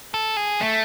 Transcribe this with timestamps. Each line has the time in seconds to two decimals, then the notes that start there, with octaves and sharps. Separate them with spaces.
0.14 A4
0.37 G#4
0.61 A3